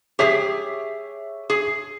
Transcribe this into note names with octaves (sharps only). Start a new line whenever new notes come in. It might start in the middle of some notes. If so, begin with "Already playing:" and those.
G4 G#4 C#5 E5 B6
G#4